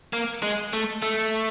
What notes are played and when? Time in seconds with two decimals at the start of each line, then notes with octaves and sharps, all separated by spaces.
0.13 A#3
0.43 G#3
0.73 A3
1.02 A3